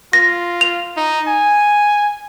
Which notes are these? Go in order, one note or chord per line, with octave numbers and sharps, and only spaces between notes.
F4 A#6
F7
D#4
G#5